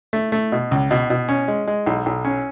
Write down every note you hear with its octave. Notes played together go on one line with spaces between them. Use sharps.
A3
A3
B2
C#2
B2
B2
C#4
G#3
G#3
B1
B1
C#4